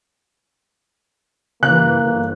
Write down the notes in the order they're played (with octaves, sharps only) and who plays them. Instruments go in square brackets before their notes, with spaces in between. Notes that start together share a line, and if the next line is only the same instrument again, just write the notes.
[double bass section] G2 E3 [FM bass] C#3 [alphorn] A#3 [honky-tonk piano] F#6
[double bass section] G1